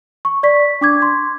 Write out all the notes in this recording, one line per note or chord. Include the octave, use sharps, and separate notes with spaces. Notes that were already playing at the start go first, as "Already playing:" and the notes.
C#6
D5 C#6 B6
D4 D6 G#6
C6